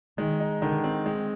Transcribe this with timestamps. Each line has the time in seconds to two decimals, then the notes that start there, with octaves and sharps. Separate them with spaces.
0.18 D#3 G#3
0.40 D#4
0.62 D3 D#3
0.84 C4
1.06 G#3